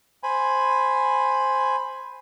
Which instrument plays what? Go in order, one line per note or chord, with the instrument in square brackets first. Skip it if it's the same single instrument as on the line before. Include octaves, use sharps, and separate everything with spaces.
[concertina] C5 G#5 B5